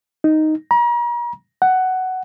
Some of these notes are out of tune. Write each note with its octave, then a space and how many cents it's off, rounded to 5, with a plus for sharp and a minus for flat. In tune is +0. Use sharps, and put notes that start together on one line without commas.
D#4 +0
A#5 +40
F#5 +10